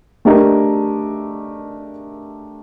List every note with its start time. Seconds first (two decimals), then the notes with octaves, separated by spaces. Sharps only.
0.25 A3 D4 G4 A#4 D#5